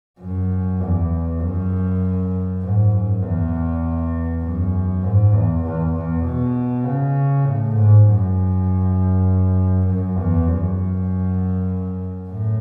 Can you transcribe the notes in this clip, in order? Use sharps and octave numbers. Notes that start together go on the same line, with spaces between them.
F#2
E2
F#2
G#2
F#2
E2
F#2
G#2
E2
E2
E2
B2
C#3
A2
G#2
F#2
F#2
E2
F#2
A2